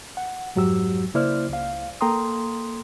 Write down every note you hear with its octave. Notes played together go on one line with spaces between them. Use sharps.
F#5
F2 G#2 F#3 F#4 G4 E6
C#3 A#3 E4 C5 D5 F6
C#2 F5
A#3 A4 G5 A#5 C6 D#6